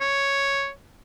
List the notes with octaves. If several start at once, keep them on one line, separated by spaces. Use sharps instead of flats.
C#5